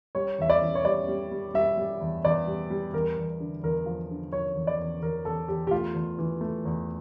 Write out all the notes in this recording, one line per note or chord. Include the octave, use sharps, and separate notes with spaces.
G3 C#5
E2 E5
D5
E3
C#5
G3 D5
G3
G3
G3 E5
G3
E2
E2 D5
G3
G3
E2 A#4
E2
D3
E2 A#4
F3
D3
F3 C#5
E2
D5
E2
E2 A#4
E2 A4
E2 G4
G4
A3 F4
E2
E3
A3
E2